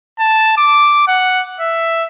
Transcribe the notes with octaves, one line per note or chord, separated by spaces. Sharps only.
A5
D6
F#5
E5